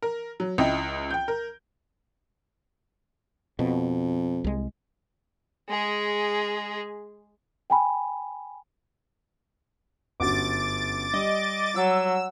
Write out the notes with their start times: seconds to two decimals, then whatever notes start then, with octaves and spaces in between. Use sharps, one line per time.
0.02 A#4
0.40 F#3
0.58 C#2 E4 D#5 G5
1.11 G5 G6
1.28 A#4
3.59 F2 B2
4.44 C2 G#3
5.69 G#3 G#4
7.70 G5 G#5 B5
10.20 G1 F#2 F#4 D6 A6
11.13 G3 D#5
11.76 F#3 E6